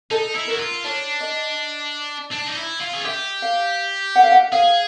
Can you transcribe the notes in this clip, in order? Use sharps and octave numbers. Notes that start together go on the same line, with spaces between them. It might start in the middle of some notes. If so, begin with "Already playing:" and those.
D#4 A4
E4
F#4 A#4
F4
D4 C#5
D#5
D4
D#4
E4
F4
G#4
G4 E5
F5
F#5
F5
F#5
G#4 F5